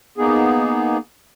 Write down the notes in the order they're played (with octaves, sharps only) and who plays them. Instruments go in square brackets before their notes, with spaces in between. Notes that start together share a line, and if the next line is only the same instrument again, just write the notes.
[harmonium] A#3 B3 D#4 G#4